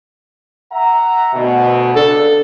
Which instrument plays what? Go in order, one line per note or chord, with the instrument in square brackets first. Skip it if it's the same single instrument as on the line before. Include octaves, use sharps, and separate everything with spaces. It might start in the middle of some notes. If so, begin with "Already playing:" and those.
[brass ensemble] E5 F#5 A#5
D2 B2
[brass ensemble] C#3 D4 [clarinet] A4